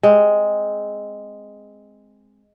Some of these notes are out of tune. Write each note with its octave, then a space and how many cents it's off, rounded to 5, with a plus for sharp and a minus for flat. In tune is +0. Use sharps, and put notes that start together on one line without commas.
G#3 +0 C4 +0